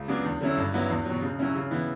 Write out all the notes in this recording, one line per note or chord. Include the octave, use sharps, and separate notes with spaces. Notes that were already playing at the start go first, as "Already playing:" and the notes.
Already playing: C#2
C#3 F#3 B3 D4
E2
D3 F#3 C#4 E4
G2
F#3 B3 E4
E2
B2 F#3
C#3
F#3 C#4 E4
C#3
E3 B3 E4